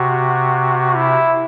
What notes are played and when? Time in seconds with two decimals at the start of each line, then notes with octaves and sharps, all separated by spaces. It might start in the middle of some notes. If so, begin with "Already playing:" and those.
Already playing: C3 F#4
0.95 E4